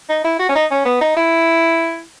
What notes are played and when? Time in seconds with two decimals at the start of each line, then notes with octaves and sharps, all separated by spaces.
0.09 D#4
0.24 E4
0.39 F#4
0.49 C#4
0.55 D#4
0.71 C#4
0.85 B3
1.01 D#4
1.16 E4